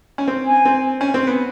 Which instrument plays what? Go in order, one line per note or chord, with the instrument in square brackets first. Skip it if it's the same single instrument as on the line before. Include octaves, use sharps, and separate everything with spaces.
[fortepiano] C#4
C4
[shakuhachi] G#5
[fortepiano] C4
C#4
C4
B3